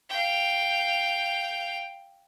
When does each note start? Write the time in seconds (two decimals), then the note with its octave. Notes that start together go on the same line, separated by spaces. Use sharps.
0.10 F5 G5